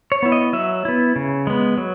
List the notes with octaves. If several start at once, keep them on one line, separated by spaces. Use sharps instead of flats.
C#5
B3 E4
D#5
F#3 E5
B3 E4
C#3
G#3 B3
F#3